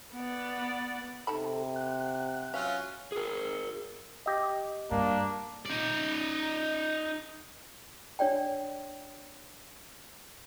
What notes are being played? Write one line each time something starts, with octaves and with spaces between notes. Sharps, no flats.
B3 D5
C3 D#4 A4 A5 B5
F#5 F#6
F#3 C#4 F4 E5 F5
G#4 A#4
G4 D#5
G2 A#3 D4
D#4 D5
D4 C#5 D5 G5